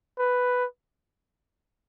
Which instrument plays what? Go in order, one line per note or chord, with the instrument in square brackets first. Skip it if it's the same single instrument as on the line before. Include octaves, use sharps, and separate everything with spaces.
[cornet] B4